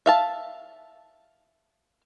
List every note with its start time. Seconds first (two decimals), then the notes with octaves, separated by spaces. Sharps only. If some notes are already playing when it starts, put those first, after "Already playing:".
0.06 E5 F5 A5